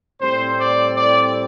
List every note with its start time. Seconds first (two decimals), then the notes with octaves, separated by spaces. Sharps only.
0.21 A2 G3 C4 C5
0.58 D5
0.95 D5